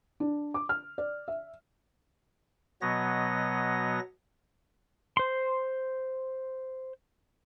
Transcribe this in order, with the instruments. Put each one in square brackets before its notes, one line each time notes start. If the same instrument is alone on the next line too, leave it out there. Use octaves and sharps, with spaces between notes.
[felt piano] D4
D6
F6
D5
E5
[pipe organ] B2 F#3 B3 C#5 D#5 A#6
[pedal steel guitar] C5 C6